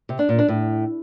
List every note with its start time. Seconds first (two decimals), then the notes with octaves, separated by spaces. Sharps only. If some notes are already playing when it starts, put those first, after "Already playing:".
0.09 C3
0.19 D4
0.29 A#2
0.39 D4
0.48 A2